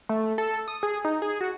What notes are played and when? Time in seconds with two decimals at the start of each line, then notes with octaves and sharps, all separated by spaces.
0.09 A3
0.38 A4
0.68 D#6
0.83 G#4
1.05 D#4
1.22 G#4
1.41 F#4